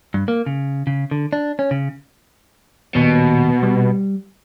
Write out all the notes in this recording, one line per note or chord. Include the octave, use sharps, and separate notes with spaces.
G2
A#3
C#3
C#3
D3
D4
C#4
C#3
D#1 B2
G3